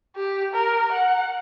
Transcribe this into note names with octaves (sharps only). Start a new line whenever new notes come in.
G4
A#4
F#5